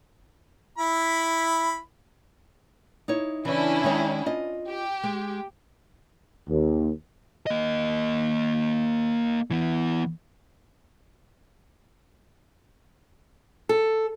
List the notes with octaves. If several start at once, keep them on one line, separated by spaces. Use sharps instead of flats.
E4 B5
D#4 E4 C#5
C#3 E3 C#4 D4 E4
D#3 G#3 C#5
F4 D#5
G4
G#3
D#2
A#3 D#5
E3 B3
A4